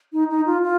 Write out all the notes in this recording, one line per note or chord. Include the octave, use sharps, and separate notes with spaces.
D#4
D#4
F4
F4